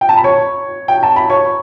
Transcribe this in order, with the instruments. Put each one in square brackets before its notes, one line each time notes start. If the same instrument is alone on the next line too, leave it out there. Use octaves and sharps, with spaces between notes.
[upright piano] G5
A5
B5
C#5 C#6
G5
A5
B5
C#5 C#6